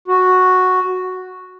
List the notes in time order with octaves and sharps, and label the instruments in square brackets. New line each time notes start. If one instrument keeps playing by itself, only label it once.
[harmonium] F#4